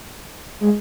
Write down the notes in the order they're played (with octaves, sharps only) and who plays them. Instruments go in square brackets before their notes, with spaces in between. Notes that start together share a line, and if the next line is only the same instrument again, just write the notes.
[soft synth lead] G#3